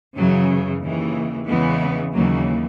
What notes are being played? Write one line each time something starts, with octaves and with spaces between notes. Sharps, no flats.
F#2 C#3 E3 F#3
D#2 C#3 E3
E2 C#3 E3 G#3 B3
D#2 C#3 E3 F#3 A#3